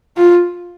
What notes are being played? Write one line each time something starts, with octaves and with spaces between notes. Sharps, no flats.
F4